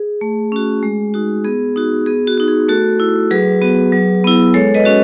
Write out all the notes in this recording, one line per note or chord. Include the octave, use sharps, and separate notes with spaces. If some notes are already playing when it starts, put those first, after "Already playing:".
Already playing: G#4
A3
C#4 F#4
G#3
D#4 F#4
B3 G#4
D#4 F#4
B3 G#4
F#4
D#4 F#4
G#4
A3 F#4 A4
E4
F#3 G#4 B4
B3 F#4
F#3
B3 E4
G#3 A4 C#5
B4 D#5
C#4 F#4